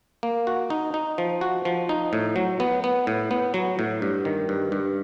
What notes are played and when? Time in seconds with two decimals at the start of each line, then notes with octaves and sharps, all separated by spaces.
0.23 A#3
0.47 F#4
0.70 D#4
0.94 D#4
1.18 F3
1.41 F#4
1.65 F3
1.89 D#4
2.13 A2
2.36 F#3
2.60 B3
2.84 B3
3.07 A2
3.31 B3
3.54 F#3
3.79 A2
4.02 G2
4.25 D#3
4.49 G2
4.72 G2